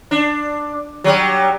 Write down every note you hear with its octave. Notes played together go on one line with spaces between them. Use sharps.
D4
F#3 G3